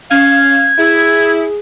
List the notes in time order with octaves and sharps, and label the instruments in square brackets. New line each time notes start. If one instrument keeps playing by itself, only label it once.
[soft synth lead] C#4 [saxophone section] F5 [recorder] G#6
[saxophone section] E4 [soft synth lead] G#4